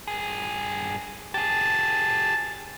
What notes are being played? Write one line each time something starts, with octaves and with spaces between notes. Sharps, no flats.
G2 G#4
G4 G#4 A5